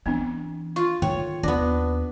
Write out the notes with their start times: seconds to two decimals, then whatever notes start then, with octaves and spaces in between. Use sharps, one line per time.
0.06 E3 B3 C4 D4
0.76 F4 C#6
1.02 D3 D#3 C#5 G5
1.43 D#2 B3 D4